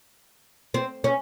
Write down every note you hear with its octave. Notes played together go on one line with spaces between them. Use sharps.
C4
C#4